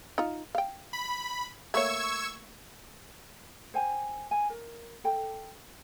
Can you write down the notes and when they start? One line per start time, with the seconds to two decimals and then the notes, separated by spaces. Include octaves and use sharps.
0.18 D#4 F4
0.55 F5 G5
0.93 B5
1.74 A3 A#3 C#5 C#6 E6 G#6
3.74 C5 G5 G#5
4.31 G#5
4.50 A#4
5.04 A4 G5